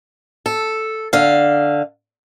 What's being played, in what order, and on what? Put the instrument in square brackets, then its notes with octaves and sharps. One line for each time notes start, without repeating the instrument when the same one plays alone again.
[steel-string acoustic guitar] A4
D3 F5